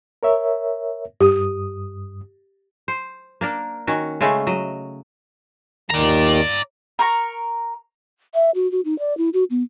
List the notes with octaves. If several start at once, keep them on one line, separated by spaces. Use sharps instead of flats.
A#4 C#5 E5
G2 G4 D#6
C5
A#3 D4 A#4
D#3 C#4 F#4
C#3 G#3 A3 C#4
F#3 D#5
D#2 D#3 D5 A#5
A#4 A#5 C#6
E5
F#4
F#4
D#4
D5
E4
F#4
B3